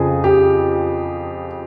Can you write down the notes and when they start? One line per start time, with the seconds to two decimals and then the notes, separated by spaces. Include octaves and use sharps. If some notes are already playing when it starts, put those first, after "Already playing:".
Already playing: F2 C#3 F3 G#4
0.24 G4